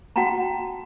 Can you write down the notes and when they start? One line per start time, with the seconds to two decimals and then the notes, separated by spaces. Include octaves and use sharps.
0.16 F#4 F#5 G5 A5 A#5